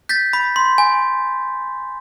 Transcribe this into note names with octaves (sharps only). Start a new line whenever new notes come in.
G6 A6 B6
B5
C6
G#5